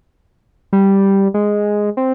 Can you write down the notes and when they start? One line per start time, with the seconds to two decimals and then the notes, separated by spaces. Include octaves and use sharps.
0.73 G3
1.34 G#3
1.97 C4